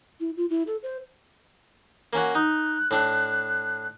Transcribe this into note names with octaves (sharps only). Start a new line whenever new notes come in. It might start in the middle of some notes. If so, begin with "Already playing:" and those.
E4
F4
E4
A4
C5
A#3 C#4 F#4
D#4 F#6
A2 D4